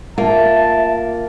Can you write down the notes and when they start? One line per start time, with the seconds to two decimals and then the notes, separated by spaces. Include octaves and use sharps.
0.18 A#3 F4 E5 A5